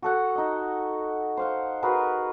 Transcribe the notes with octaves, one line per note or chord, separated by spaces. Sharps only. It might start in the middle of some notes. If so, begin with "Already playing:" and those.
F#4 A4 F#5
D#4 D#5
C5 F5 F#5
F#4 G#4 A#4 B4